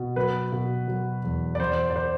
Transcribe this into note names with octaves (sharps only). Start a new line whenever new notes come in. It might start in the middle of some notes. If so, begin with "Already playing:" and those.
Already playing: B2
F#3 B4
B2
F#3
E2
D5
E2 C5
D5
C5